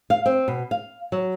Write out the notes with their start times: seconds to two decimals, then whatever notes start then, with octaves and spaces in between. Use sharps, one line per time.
0.10 F5
0.26 C4
0.48 B2
0.71 F5
1.12 F#3